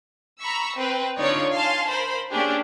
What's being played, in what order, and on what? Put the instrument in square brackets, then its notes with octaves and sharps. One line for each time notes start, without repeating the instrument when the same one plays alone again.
[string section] A#5 B5 C#6 E6 B6
C4 B4
D3 D#4 F4 C#5 D5
F5 G#5 A5 C6
A#4 C5 B5
A#3 C#4 D4 G4 G#4